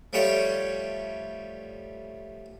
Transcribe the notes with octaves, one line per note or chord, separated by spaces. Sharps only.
F3 G3 A3 C#5 G5 A5